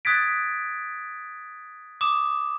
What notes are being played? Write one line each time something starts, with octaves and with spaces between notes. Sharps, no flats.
D#6 F#6 G#6 A6 B6 D7
D6 D#6 E7